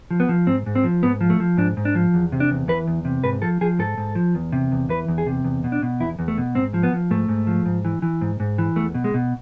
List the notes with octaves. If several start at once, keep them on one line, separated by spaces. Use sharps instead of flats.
F3
B3
F3
G#2 C4
G#2
C4
F3
G#2 B3
F3
A3
F3
G#2 D4
G#2
D4
F3
E2
C3
D4
E2
E3 B4
E2
C3
G#2 B4
F3 A4
F3 G#4
G#2 A4
G#2
F3
E2
C3
E2
E3 B4
E2
G#4
C3
E2
B2
D4
B2
E2 E4
E2
A3
B2
G#2 C4
F3
B3
F3
G#2 A3
G#2
F3
G#2
E3
E3
G#2
G#2
E3
E2 A3
B2
G#3
B2